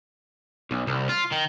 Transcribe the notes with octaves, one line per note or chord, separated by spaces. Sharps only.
B1
C2
F4
D#3